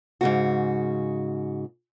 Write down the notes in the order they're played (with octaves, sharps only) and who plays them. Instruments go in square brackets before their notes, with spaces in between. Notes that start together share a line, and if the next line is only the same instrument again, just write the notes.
[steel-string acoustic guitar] G#2 C#3 F#4